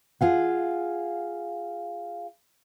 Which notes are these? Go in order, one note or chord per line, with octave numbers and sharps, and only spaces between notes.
F4 G#4 F5 F#5